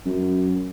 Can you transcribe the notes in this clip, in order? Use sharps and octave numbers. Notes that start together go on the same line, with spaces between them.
F#2